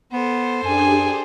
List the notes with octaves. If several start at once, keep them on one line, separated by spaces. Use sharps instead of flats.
B3 A4 C5
F#2 D4 G4 G#4 G#5